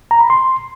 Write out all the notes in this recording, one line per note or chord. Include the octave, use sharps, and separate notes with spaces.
A#5
B5
C6